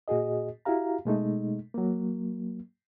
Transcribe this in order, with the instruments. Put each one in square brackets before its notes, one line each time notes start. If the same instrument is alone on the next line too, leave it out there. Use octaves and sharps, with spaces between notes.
[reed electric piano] A#2 F#4 G#4 D#5
E4 F#4 G4 F5 A#5
B2 G#3 A3 D#4
F#3 A#3